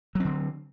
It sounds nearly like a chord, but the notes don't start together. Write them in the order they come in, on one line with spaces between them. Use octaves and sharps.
F#3 C4 D3